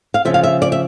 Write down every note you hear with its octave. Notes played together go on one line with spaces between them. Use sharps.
F5
C#3 F3 E5
F5
E5
D5
E5